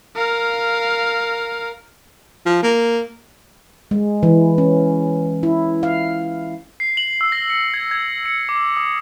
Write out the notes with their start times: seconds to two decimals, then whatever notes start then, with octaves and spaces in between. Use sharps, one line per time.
0.16 A#4 F5
2.46 F3
2.63 A#3
3.91 G#3
4.23 E3
4.58 C#4
5.43 E4
5.83 F5
6.80 C7
6.97 F#7
7.21 E6
7.32 A#6
7.50 C#7
7.74 G#6
7.91 G#6
8.26 C#7
8.49 D6
8.77 D#6